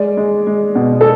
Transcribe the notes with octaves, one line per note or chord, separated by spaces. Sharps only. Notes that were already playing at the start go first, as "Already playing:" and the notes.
Already playing: G#3 D5
G#3
G#3
B2
A4